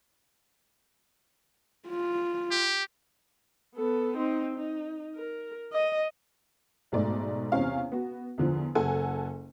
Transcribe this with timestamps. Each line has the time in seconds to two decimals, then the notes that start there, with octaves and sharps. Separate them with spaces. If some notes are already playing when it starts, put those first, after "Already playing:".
1.88 F4
2.51 G4
3.75 B3 A4
4.16 C4 D#4
4.57 D#4
5.16 A#4
5.72 D#5
6.92 B1 G#2 A3 D5
7.52 E2 C3 C4 C#4 F5
7.92 B3 F#4
8.38 E2 D3 F3
8.75 F#1 A4 F#5 G#5